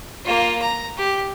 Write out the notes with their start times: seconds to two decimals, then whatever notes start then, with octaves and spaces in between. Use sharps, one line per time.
0.25 A#3 F4
0.62 A#5
0.98 G4